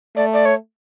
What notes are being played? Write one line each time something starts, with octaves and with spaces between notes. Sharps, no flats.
A3 D5
D5
C#5